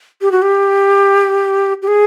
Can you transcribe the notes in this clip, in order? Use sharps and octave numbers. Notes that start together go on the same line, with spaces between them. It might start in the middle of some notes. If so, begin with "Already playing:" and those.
G4
F#4
G4
G4
G#4